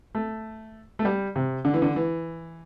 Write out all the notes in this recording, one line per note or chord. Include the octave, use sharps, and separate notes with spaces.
A3
A3
G3
C3
D3
E3
D3
E3